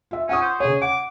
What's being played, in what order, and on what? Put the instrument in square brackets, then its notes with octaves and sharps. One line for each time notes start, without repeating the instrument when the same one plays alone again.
[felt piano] F4 E5
[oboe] C#4 [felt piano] F#5 C#6 D#6
[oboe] C5
[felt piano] C#3 C#5 [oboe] G#4
[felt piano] F#5 [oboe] D6